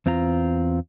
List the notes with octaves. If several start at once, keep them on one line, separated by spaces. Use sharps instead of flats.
E2 C4 F4 A#5